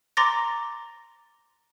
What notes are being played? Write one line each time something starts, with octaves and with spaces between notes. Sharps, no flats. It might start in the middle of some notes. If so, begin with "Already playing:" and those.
A#5 C6 D6 A6 A#6